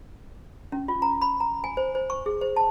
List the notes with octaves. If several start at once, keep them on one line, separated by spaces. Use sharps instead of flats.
C#4
F4
A#5
B5
A#5
G#5
C5
C5
C#6
G#4
C5
A5